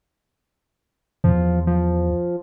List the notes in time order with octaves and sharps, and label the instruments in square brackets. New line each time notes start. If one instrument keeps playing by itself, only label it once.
[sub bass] E2 [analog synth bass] F3
[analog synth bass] F3